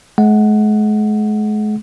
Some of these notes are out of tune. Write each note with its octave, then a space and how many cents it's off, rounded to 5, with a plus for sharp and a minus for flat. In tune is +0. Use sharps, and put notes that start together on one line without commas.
G#3 +40 F#5 +0